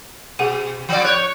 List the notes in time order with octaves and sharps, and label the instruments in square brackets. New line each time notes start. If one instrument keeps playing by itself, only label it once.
[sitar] B2 [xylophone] G#4 F#5 D#7
[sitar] F3 D5
[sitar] C#5 [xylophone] F#6 G6